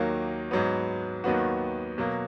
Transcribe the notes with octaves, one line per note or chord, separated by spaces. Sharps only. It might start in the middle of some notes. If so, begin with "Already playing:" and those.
Already playing: D#2 D#3 F#3 A#3
G#2 F#3 B3
D#2 D#3 F#3 B3 F#4
B2 F#3 A#3